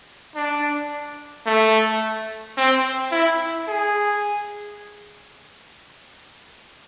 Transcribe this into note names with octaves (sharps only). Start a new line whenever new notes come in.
D4
A3
C4
E4
G#4